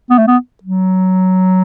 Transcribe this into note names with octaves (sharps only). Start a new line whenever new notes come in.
B3
A3
B3
F#3